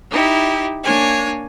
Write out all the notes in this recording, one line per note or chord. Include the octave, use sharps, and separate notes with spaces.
D#4 E4 G4
A#3 D4 C#5 G#5